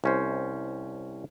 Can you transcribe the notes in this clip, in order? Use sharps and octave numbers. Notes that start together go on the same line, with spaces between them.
C2 C#4 C5